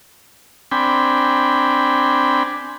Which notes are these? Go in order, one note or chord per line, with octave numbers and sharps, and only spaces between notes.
C4 D4 G5 G#5 B5